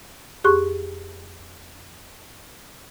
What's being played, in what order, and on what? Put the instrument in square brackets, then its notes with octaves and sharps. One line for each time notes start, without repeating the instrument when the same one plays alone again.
[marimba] F2 G4 G#4 C6 C#6 F#6